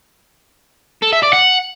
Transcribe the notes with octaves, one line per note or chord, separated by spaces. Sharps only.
A4
E5
D5
F#5